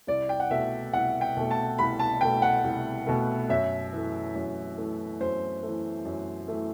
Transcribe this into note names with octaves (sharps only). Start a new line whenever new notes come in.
C2 D5
G5
F#5
B2 A3 E5
C2 F#5
G5
B2 A3
A5
C2 B5
A5
B2 A3 G5
F#5
C2
B2 A3
F#2 E5
E3 A3
F#2
E3 A3
F#2 C5
E3 A3
F#2
E3 A3